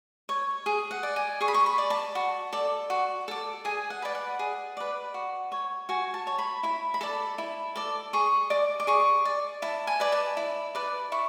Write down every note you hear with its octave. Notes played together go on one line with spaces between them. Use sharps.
C#5
G#4
F#5
D5
G#5
G#4 C#6
B5
C#6
B5
D5
A5
F#4
A4 D5
F#4
A4 D5
G#4 G#5
F#5
B4 D5
F#5
G#4
B4 D5
F#4
C#5
F#4 G#5
A5
C#5
B5
E4 B5
B5
A4 D5 A5
E4
A4 D5
G#4 C#6
D5 D6
D6
G#4 C#6
D5
E4 A5
G#5
B4 D5
A5
E4
B4 D5
E4 C#6